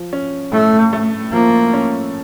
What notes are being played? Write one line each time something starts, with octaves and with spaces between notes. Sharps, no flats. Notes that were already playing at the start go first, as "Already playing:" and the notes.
Already playing: F3
C#4
A2 A3
A3
F3 A#3
C#4